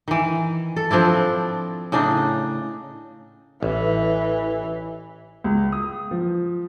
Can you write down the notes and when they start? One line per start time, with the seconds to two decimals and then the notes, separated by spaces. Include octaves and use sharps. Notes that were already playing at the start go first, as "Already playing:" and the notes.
0.08 D#3 E3
0.76 A4
0.91 F3 C4 D4 E4
1.92 A2 C#3 D4 D#4
3.63 A1 E3
5.44 C#2
5.72 D#6
6.11 F3